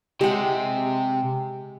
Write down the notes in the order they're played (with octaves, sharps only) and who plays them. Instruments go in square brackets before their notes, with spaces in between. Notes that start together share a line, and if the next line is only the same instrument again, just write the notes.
[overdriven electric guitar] C3 [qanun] G#3 F#5 [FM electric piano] G4 G5